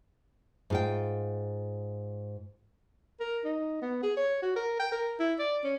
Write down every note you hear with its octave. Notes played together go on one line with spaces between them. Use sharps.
G#2 F4 G5
A#4
D#4
B3
G#4
C#5
F#4
A#4
G5
A#4
E4
D5
C#4